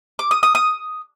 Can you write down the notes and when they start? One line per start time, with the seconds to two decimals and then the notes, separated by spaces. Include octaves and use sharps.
0.19 D6
0.31 D#6
0.43 D#6
0.55 D#6